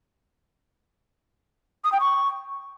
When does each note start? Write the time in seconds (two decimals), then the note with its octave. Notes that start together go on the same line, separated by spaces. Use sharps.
1.84 D#6
1.92 G5
2.00 C#6